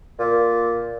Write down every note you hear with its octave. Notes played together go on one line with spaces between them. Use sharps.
A#2